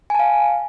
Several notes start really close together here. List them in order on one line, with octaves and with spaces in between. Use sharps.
G#5 A5 F5